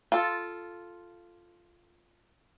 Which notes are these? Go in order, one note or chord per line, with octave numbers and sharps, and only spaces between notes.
F4 A4